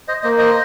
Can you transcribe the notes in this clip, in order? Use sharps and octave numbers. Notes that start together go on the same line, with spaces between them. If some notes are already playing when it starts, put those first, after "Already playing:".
C5 D#5
A#3 C5 D#5
C5 D#5